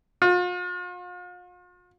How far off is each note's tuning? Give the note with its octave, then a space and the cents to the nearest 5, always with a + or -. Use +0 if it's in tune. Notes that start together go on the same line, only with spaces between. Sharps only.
F4 +40